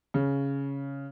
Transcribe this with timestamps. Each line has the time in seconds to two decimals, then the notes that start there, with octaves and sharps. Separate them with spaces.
0.14 C#3